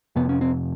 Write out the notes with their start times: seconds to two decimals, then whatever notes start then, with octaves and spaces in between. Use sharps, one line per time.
0.16 F2 C3 B3
0.29 C#4
0.41 C4